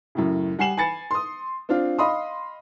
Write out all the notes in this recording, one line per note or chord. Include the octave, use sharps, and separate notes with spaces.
F#2 A2 C#3
G3 F#5 G#5 C7 E7 F#7
G#5 B5 A6 C#7
C6 D#6
C4 D4 F4 F5
D#5 F5 B5 C6 D#6